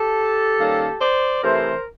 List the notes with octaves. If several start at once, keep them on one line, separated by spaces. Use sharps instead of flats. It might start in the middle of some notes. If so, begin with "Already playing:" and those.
Already playing: G4 A4
D#3 G3 A#3 C#4
C5 D5
C3 E3 A3 A#4 C5